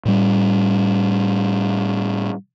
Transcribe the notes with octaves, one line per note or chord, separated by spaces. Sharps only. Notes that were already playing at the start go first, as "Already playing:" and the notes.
A2 G3